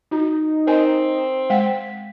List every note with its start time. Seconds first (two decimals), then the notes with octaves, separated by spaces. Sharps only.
0.11 D#4 F#4
0.67 C4 A#4 D#5 G#5
1.50 G#3 F#5 G5 B6